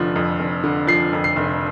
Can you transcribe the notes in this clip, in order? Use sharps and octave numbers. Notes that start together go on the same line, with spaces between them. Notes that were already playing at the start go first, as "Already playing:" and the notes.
Already playing: F1 D3 F3
F2
F1
D3
F3 C7
F2
C7
F1